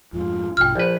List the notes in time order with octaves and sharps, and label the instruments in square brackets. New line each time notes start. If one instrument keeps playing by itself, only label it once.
[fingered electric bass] F2 G#2 [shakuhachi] F4
[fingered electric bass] A#1 G2 B2 [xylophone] G5 F6
[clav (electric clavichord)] A#1 B4 [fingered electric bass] F3